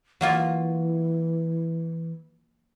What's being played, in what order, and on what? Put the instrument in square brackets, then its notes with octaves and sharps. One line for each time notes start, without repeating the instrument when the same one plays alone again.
[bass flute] E3 [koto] F#3 A#3 F4